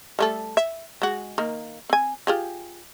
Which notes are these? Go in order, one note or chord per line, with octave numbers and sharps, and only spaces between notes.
G3 A3 A4
E5
G#3 F#4
D#3 A#3
C4 G#5
F4 G4 G#4